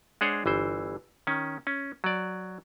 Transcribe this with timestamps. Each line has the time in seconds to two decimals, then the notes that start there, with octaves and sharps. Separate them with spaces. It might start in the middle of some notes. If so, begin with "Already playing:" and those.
0.21 G#3 D4 G#4 C5 C#5 F#5
0.46 G1 E3 C5
1.27 D#3 C#4
1.67 C#4
2.04 F#3 D5